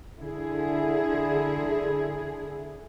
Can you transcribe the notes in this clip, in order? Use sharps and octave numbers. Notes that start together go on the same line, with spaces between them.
D3 E4 G#4